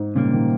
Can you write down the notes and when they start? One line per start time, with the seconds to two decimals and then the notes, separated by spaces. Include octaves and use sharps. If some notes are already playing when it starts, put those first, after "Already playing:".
Already playing: G#2
0.15 A#2 C#3 G3 A#3
0.33 D#3